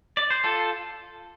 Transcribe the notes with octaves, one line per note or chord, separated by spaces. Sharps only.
D5
C5
F4 A4